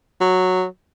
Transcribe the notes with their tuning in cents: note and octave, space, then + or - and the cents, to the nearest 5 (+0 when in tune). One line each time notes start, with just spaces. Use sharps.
F#3 -5